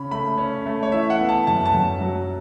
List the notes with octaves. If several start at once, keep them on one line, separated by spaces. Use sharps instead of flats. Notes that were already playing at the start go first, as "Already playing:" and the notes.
Already playing: C#3 C#4 B5
A3 B5
C#4
A3
C#5
E3 E5
F#5
B3
A5
F#2 A5
A5
F#2
F#3